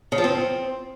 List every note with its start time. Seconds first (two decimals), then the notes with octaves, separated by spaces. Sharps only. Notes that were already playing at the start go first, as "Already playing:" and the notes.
0.12 C#3
0.18 F3
0.24 C4